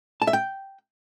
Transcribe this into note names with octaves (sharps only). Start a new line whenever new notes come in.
A5
E5
G5